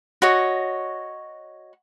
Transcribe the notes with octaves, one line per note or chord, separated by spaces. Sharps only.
F#4 C#5 D#5